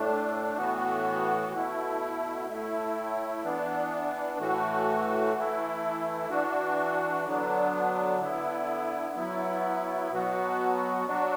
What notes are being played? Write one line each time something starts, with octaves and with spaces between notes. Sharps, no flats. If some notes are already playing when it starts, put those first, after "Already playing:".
Already playing: A2 A3 D4
A2 E3 B3 F#4
B2 A3 E4
A2 A3 E4
E3 B3 D4
A2 E3 A3 F#4
E3 A3 E4
E3 D4 F#4
D3 F#3 B3 D4
D3 B3 E4
F#3 B3 E4
B2 F#3 B3 F#4
F#3 D4 F#4